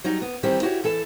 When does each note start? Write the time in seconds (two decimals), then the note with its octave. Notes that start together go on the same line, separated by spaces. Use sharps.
0.04 F#3 G3 D#4
0.22 B3
0.43 D#3 E3 G3 C4 D#4 G4
0.62 E4 F#4 G4 C#5
0.84 E3 A4 A5